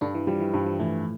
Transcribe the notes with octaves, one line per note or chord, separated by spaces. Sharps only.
G2 D3 D4
E3
F3 G3
E3
G2 F3
F3
A2 E3 A3